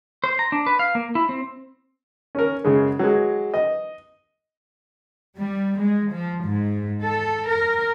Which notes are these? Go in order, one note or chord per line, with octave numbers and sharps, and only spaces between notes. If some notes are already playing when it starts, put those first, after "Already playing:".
C5
A#5
D4
B4
F5
A#3
E4
C4
C#4 A#4
F#2 C#3 G#3
F#3 G#3
D#5
G3
G#3
F3
G#2
A4
A#4